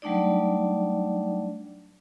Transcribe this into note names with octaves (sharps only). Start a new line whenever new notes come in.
F#3 G3 A3 D4 D#4 D5